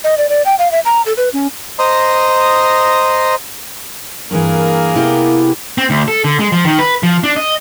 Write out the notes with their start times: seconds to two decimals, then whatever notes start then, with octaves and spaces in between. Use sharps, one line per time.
0.04 D#5
0.18 D5
0.29 D5
0.46 G5
0.59 F5
0.72 E5
0.85 A#5
1.06 A4
1.17 B4
1.33 C#4
1.79 C5 D#5 A#5 C6 D#6
4.31 G2 E3 A#3 G#4 A#4
4.95 C3 B3 E4 G4
5.78 C4
5.90 D2
6.08 A4
6.24 D3
6.40 G#3
6.52 F3
6.65 D#3
6.79 B4
7.03 F3
7.24 D4
7.36 D#5